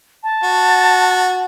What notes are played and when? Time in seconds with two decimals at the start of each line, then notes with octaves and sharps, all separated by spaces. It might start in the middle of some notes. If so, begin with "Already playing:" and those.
0.23 A5
0.44 F#4